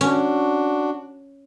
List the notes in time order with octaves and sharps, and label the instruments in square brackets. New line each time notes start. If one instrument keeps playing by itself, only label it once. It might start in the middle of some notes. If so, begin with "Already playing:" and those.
[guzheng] C#4 [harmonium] D4 F#4